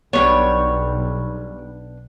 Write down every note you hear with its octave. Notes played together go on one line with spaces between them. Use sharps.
B1 G3 B3 D4 C#5 G5